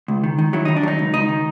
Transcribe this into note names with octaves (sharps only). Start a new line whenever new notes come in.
C#2
D#3
D#3
F#3 E4
D#3 D#4
D4
F#3 D#4
C#2
C#2 D#4
D#3